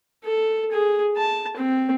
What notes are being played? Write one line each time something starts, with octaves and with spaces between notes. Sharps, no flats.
A4
G#4
A5
C4